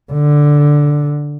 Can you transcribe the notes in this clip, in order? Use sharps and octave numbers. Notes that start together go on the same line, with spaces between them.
D3